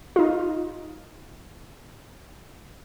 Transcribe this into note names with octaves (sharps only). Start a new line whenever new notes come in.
D#4 F4